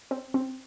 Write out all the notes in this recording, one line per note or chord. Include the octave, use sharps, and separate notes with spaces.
C4
C4